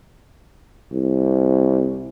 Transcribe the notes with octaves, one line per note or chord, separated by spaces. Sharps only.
C2